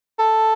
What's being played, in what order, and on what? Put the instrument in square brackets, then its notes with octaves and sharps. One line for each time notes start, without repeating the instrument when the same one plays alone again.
[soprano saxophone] A4